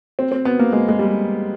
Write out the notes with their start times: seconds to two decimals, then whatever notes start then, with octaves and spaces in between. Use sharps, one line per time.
0.19 C4
0.32 C4
0.45 B3
0.59 A#3
0.72 G#3
0.88 G#3
0.99 G3